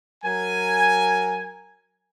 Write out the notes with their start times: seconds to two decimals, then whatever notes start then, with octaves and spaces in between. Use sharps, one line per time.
0.24 F#3 A#4 G#5